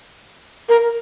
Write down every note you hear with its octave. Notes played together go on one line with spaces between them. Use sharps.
A#4